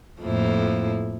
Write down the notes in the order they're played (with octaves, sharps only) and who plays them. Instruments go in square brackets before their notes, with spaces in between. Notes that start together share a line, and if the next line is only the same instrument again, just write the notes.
[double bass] F2 A2 [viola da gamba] F3 A#3 E4